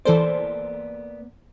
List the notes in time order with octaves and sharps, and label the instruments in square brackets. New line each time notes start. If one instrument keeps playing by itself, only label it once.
[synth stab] E3 A4 C5 [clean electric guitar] A#3 B3 D5